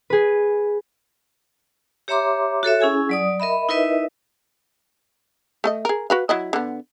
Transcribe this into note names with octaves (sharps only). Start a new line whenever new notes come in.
G#4 B4
G4 C#5 E5 A#5 C6 D6
F#4 A4 C#5 E5
C#4 E4 G#4 G#5
F#3 D5 D#6
A#4 D#5 E5 B5
D#4 E4 A#4 B4 D#5 E5
A3 A4 D#5
G#4 A#4
F#4 B4 F5
F#3 E4 D#5
D3 B3